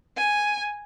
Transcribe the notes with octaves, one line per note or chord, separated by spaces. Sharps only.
G#5